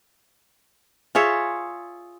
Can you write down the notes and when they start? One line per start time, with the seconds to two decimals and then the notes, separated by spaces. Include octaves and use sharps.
1.15 F4 G#4 C#5 E5